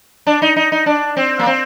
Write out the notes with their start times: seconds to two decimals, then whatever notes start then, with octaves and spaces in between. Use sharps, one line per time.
0.27 D4
0.42 D#4
0.56 D#4
0.72 D#4
0.86 D4
1.17 C4
1.39 A#3
1.46 C4